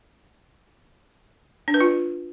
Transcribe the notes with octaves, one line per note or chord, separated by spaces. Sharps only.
D4
B4
F4